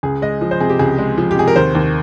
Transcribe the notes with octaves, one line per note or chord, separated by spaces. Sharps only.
C#2 G#4
G#3 D#5
F3
C5
C3 G#4
G4
C#2 G#4
G#3
F3
G4
C3 G#4
A#4
D#2 C5
D#2